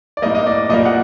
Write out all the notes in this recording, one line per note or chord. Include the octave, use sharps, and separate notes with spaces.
D5
A2 G3 A#3 D#5
D#5
D5
A#2 G3 A#3 D#5
F#5